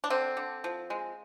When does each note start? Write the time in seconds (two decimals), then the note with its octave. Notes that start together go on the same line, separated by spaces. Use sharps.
0.04 D4
0.10 D3 C4
0.37 D3
0.64 F3
0.90 G#3